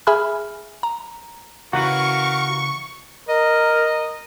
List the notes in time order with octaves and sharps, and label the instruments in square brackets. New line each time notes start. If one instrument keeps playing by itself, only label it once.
[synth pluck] G#4 E5 G#5 B5 F6
A#5
[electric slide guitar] C#3 E3 B4 [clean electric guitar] F#4 [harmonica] A#4 F5 [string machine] C#6
[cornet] A#4 [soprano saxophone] D#5